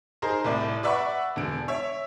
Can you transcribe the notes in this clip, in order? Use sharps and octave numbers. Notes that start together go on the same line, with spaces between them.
D#4 G#4 A#4 C5
C2 A2 D5
B4 D5 E5 F#5 B5 C#6
E1 D3 D7
C#5 E5